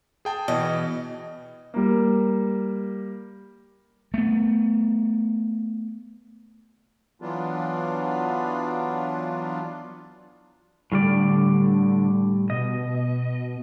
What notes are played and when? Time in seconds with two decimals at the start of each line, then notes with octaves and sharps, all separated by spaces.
0.25 G#4 G5 A5
0.48 B2 E3 D#5
1.74 G3 A#3
4.14 A3 B3
7.22 E3 F#3 B3 D4 F4
10.92 A2 D3 G3 D5
12.50 B2 D#5